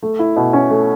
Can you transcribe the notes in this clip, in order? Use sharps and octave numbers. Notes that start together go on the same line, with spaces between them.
A3
E4
B2
C#4
A3